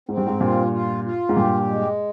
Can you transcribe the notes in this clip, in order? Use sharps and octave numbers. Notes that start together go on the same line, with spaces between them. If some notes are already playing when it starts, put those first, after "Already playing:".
G#2 C4
G2
G#2
G2 A#2 F4
F4
F4
G#2
G2 A#2 G4
G#3